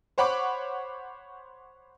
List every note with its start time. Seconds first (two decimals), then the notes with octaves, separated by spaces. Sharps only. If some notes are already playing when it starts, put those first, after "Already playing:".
0.18 C5 C#5 F#5 B5 C#6 D6